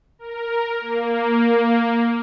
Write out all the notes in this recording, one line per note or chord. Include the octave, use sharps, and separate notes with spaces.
A#4
A#3